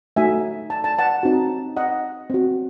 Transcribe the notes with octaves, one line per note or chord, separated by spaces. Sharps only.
A3 D#4 F#4 E5 G#5
A5
A5
F#5 A5
C4 D#4 F#4
D#5 F#5
C4 F#4